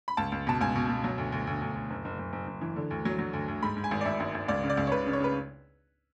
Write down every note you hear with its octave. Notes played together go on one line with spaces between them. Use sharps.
B5
C#2 A5
C#2
B2 A5
C#2 G#5
B2
B2
F#3
D2
D2
D2
D2
D2
F#1
F#1
F#1
F#1
F#1
E3
D3
D2
F#3
F#3
D2
D2
G#2 B5
G#2
G#5
G#1
D5
G#1 E5
G#1
G#1
C#2 D5
C#3
D5
C#2
C#5
C#2 B4
C#3
C#5
C#3 B4